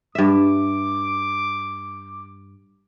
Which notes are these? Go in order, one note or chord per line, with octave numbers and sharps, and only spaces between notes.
G2 E5 D6